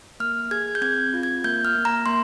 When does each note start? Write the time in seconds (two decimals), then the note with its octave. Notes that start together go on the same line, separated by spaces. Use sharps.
0.20 A#3 F6
0.51 G#4 G#6
0.75 G6
0.82 C4 G#6
1.14 F4
1.23 G#6
1.44 A#3 G6
1.65 F6
1.75 A#3
1.85 A#5
2.06 A#3 C6